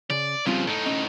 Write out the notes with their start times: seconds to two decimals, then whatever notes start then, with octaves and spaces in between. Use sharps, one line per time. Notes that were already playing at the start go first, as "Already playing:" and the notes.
0.10 C#3 D5
0.46 C#3 F3 G3 C4 F4
0.67 A2 D#4 A4
0.86 C#4 D#5